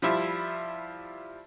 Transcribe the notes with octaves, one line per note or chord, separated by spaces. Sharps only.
F3 G3 E4